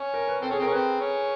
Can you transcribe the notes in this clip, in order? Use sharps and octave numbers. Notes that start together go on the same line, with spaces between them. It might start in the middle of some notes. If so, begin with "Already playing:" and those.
Already playing: C#4
A#4
B4
C4 A4
C#4 G#4
C4 A#4
C#4
C4 B4
C#4